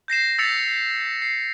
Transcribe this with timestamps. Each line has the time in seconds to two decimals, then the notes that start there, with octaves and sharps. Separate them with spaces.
0.08 G6 A#6 C7 E7
0.39 E6 A6 B6 C#7 F7
1.22 C7